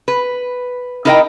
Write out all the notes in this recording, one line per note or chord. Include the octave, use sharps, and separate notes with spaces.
B4
D#4 E4 A#4 D#5 F5 G5